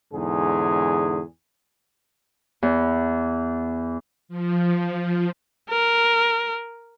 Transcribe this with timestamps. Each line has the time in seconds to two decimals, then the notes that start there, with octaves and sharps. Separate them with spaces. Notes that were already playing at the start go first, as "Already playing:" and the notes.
0.12 E2 G#2 D3 G#4
2.63 E2
4.29 F3
5.70 A#4